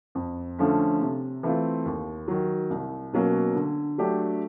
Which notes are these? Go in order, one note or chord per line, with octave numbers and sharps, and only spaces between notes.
F2
D3 F3 A3 C#4
C3
E3 A3 C4 F4
D#2
D#3 F#3
C2
B2 F#3 A#3 C#4
D3
F#3 A3 D4 G4